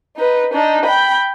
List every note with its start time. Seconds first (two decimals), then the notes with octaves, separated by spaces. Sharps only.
0.17 D#4 B4
0.53 D4 D#4
0.85 G5 B5